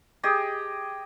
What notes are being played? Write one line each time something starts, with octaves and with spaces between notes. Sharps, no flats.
G4 G#4 D#5